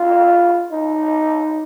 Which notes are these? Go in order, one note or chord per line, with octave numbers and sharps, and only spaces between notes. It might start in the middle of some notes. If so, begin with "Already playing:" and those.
Already playing: F4
D#4